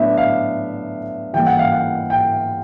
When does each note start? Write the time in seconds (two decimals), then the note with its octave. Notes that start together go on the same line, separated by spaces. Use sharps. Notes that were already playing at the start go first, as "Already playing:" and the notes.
Already playing: A2 F#3 B3 D4 E5
0.17 F5
1.33 E3 G3 A#3 G5
1.47 F#5
1.59 F5
1.73 F#5
2.10 G5